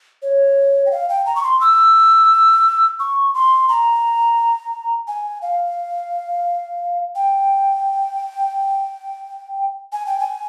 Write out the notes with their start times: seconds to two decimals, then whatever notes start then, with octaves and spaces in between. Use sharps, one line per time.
0.22 C#5
0.86 G5
0.91 F5
1.09 G5
1.26 A#5
1.36 C#6
1.43 C6
1.61 E6
3.00 C#6
3.34 C6
3.69 A#5
5.07 G#5
5.42 F5
7.15 G5
9.92 G#5
10.07 G5
10.20 G#5